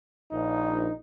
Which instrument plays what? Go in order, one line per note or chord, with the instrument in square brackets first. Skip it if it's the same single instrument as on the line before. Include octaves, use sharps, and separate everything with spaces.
[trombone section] A#1 D#4